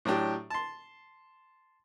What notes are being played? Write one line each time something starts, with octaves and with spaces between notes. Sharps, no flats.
A2 F#3 D4 G4
A5 C6